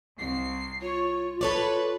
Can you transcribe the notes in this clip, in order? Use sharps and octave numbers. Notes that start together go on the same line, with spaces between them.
C2 C7
F4 C#5
A4 B4 C#5 D5